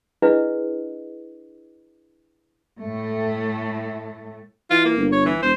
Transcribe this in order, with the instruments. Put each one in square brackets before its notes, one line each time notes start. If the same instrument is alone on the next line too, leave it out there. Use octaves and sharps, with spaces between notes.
[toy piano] D4 E4 G#4 B4 D#5 F5
[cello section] A2 A3
[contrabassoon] E3 [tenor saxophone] F4
[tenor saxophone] A#3
[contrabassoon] G1
[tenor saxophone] C#5
E3
[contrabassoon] E1 [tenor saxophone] C5